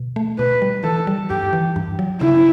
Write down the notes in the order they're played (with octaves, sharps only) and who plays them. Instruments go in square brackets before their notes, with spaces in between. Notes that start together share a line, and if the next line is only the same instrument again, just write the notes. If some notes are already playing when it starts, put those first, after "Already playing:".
Already playing: [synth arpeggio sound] B2
A3
[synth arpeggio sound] B2 [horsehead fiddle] B4
[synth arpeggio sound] G3
[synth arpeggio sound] E3 [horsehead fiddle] A4
[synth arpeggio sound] G3
[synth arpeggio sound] G2 [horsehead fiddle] G4
[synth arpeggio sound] E3
G2
F#3
[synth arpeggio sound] C#3 [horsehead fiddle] E4